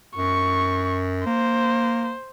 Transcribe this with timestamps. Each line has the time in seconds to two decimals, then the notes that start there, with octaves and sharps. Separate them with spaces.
0.16 F#2 C#6
1.26 A#3 C5